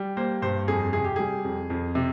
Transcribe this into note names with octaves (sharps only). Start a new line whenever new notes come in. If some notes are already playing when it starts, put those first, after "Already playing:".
Already playing: G3
A#3 C5
G2 C5
F2 G#4
C3 G#4
G4
G3 G#4
F2
F2
C3